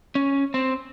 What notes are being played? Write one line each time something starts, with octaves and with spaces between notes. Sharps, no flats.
C#4
C4